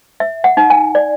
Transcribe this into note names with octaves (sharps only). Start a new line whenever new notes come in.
E5
F#5
D#4
G#5
D5